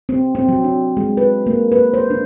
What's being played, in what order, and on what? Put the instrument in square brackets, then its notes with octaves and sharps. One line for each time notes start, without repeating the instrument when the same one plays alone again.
[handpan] C4
C4
F#3
D4
G#3
B4
A#3
B4
C5
D4